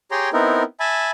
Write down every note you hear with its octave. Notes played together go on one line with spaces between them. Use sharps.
G4 G#4 C#5 G5 A#5 C6
B3 C4 D#4 E4 A#4
E5 G#5 A5 B5